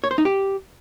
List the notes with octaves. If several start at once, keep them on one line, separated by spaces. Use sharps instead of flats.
C#5
C5
D#4
G4